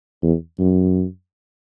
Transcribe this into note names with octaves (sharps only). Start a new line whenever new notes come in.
E2
F#2